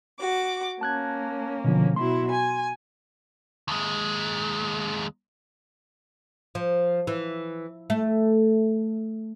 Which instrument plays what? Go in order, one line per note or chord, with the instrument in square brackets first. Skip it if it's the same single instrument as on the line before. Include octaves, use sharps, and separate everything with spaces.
[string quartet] F#4 D6
[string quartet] A#3 C#4 [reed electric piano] A5 F#6 G#6
[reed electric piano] B2 D3 F3
[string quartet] B2 F#3 E4 [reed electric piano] C6
[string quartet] G#5
[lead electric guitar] D#2 G#3
[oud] F3
E3
A3